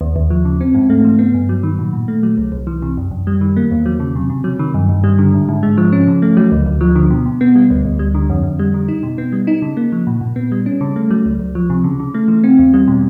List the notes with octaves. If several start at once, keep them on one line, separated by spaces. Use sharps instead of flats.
D#2
D#2
F3
C#3
C4
G#2
A3
E3
B3
G2
F#3
D#3
A#2
A#2
A3
F#3
C2
C2
E3
C3
F#2
F#2
G3
D#3
A#3
E2
F#3
C#3
C3
C3
F#3
D#3
G2
G2
G3
D3
G#2
G#2
G#3
F3
C#4
C#3
A3
F#3
D2
D2
F3
D3
B2
B2
B3
G3
D2
D2
G3
D3
F2
F2
G3
D3
D#4
B2
B3
G3
D#4
C#3
A#3
F3
A#2
A#2
B3
G3
C#4
C#3
A3
F#3
C#2
C#2
F3
C3
C#3
C#3
A3
E3
C4
E2
G3
B2